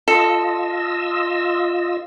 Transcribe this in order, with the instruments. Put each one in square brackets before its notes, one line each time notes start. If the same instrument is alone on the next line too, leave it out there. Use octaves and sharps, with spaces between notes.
[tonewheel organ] F4 D#5 E6 [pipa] A4